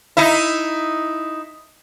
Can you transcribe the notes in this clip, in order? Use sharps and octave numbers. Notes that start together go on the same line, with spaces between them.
D#4 E4